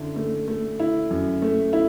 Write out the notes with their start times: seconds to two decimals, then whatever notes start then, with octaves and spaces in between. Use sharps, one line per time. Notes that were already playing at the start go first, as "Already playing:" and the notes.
Already playing: F#2 D3 E4
0.16 A3
0.48 A3
0.80 E4
1.11 F#2
1.42 A3
1.73 E4